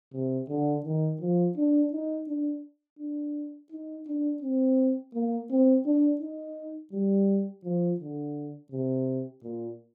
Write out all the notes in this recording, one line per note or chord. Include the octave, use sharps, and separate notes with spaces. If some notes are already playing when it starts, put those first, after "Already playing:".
C3
D3
D#3
F3
D4
D#4
D4
D4
D#4
D4
C4
A#3
C4
D4
D#4
G3
F3
D3
C3
A#2